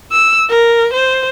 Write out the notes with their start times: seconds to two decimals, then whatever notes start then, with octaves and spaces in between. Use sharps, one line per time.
0.12 E6
0.50 A#4
0.93 C5